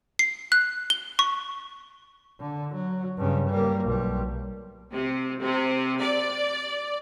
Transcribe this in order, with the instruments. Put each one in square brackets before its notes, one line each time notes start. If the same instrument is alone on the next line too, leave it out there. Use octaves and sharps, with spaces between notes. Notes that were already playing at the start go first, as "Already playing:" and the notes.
[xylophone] C7
F#6
G7
C#6
[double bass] D3
F#3
G2 C#3
G3 A#3
B1 G3
[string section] C3
C3
D5